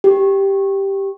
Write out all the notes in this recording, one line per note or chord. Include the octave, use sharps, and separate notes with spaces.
G4